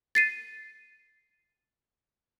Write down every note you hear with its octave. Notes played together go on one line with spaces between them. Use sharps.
A6 C7 D#7